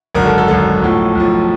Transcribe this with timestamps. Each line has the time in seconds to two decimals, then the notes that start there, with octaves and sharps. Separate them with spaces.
0.15 G#1 F#2 D3 A#4
0.26 A4
0.38 A4
0.48 G#1 F#2 D3 A4
0.82 B1 A2 F3
1.15 B1 A2 F3